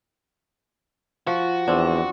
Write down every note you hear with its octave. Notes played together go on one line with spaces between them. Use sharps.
F3 F#4
E2 C4 D4